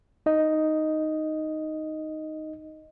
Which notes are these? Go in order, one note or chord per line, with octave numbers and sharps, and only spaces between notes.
D#4 D#5